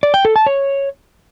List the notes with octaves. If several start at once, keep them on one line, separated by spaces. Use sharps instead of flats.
D5
G5
A4
A5
C#5